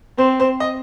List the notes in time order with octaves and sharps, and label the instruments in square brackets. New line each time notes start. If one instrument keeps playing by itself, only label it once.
[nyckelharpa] C4 [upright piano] C5
[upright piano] C5
D#5